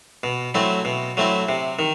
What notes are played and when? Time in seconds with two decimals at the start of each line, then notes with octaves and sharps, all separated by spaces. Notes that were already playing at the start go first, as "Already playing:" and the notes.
0.23 B2
0.54 F#3 A3 C4 E4
0.85 B2
1.17 F#3 A3 C4 E4
1.49 C3
1.79 D#3